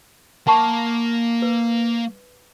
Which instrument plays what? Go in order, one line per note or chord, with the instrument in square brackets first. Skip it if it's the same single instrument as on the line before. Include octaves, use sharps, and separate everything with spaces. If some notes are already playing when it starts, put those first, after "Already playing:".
[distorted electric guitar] A#3 [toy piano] F#5 A5 C#6
[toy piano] B4